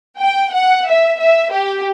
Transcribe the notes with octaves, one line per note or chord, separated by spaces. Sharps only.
G5
F#5
E5
E5
G4